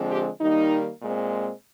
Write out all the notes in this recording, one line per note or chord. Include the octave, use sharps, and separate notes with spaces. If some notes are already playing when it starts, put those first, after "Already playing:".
Already playing: D3 F3 G#3 C4
G4
D#3 G3 A#3 D#4
A#2 G#3 C4